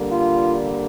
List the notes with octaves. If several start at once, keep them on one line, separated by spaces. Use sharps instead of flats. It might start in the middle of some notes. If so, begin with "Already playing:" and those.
Already playing: D3 G3 A#3
F4